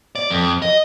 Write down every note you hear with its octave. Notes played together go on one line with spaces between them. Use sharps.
D5
F2
D#5